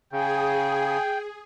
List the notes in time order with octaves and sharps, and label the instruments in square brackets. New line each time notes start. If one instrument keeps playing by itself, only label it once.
[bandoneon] C#3 [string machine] G#4 [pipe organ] G5